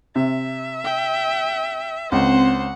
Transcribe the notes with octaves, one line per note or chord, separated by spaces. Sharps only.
C3 E5
G5
C#2 C4 C5 F#5